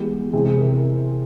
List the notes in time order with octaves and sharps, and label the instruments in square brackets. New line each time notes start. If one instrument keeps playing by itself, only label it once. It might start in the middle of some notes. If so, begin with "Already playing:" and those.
Already playing: [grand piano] E3 G#3 B3 G4
C3 E3 G#3 C4 G#4
G#4
A#4